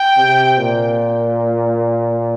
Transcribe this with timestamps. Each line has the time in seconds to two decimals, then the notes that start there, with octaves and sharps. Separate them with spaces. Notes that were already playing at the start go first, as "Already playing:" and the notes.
Already playing: G5
0.17 C3
0.57 A#2